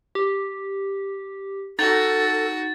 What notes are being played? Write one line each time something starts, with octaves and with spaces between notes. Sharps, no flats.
G4
D#4 F#4 A4 A6